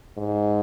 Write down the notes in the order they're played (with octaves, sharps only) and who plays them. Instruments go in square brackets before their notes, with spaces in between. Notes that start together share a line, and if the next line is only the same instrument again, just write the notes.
[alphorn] G#2